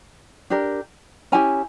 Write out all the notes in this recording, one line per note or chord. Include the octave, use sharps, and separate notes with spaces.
D4 G4 A#4
C#4 E4 G4 G#5 A#5